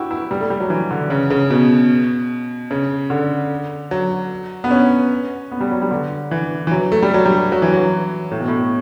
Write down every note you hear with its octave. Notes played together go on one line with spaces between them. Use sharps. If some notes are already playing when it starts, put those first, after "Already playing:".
Already playing: E4 F#4 G4
E4
G3
A3
G3
F#3
E3
D3
C#3
C#3
B2
C#3
D3
F#3
B3
C#4
B3
G3
F#3
G3
D3
E3
E3
F#3
A3
G3
F#3
G3
F#3
E3
F#3
A2
B2
A2